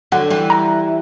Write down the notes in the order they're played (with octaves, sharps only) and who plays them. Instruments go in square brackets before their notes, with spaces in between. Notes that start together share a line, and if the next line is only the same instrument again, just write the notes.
[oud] D3 F#3 [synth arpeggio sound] F#5
[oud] E3 G3
[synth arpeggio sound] A#5